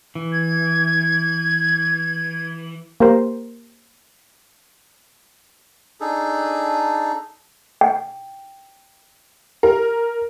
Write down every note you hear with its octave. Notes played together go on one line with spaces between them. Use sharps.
E3
G#6
A#3 G4 A#4 C5
D4 D#4 G#4 A4
G5
A#4